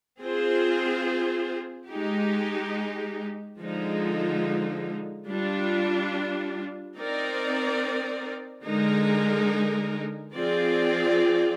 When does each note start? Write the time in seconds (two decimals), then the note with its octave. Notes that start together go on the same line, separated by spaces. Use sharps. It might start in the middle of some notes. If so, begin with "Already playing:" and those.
0.22 C4 F4 G#4 C5
1.91 G#3 D#4 G4
3.59 D3 F3 G#3 D#4
5.28 G3 D4 F4
6.96 C4 D#4 A#4 D5
8.65 D3 G#3 D#4 A#4
10.34 F3 C4 F4 G#4 D5